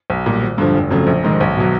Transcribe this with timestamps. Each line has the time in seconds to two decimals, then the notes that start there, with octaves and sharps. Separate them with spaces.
0.10 B1
0.26 A#2 G3
0.42 G#1
0.58 G2 D3 F3
0.74 F1
0.91 F2 C#3 F#3 A3
1.07 A#1
1.24 G#2 D#3 G#3
1.41 B1
1.57 B2 F#3